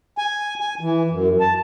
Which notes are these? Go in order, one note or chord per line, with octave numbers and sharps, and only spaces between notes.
G#5
G#5
E3
F#2
A5